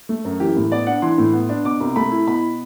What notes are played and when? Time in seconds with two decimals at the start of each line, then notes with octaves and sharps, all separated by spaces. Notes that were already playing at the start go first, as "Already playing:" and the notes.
0.09 A3
0.25 F#2
0.40 E3 G4
0.56 A2
0.71 B3 D5
0.87 D4 F#5
1.02 E3 C6
1.18 A2
1.33 B3
1.49 D4
1.65 B2 D6
1.80 C2
1.96 A3 B5
2.11 E4
2.27 B2 B5